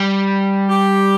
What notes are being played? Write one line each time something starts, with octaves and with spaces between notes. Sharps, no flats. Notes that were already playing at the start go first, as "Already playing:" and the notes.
Already playing: G3
G4